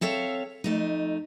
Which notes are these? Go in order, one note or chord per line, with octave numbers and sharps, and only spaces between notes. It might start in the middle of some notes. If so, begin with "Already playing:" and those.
C4 A4 C#5 E5 F5
F2 A3 D#4